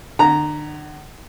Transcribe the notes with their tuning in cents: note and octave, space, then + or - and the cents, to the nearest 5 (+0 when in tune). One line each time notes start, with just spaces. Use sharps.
D3 +40 A#5 -5